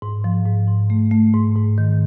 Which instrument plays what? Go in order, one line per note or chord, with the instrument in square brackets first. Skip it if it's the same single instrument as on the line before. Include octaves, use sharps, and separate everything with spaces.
[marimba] G#2
F3
G#2
G#2
A3
A3
G#2
G#2
D#3